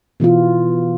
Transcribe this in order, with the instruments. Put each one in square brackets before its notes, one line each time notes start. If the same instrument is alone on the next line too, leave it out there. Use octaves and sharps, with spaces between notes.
[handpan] B2 E3 B3 F4